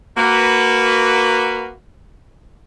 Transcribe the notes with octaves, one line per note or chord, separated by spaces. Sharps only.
A#3 F#4 B4